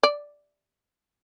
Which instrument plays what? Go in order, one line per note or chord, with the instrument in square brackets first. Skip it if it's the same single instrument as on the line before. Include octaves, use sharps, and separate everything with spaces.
[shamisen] D5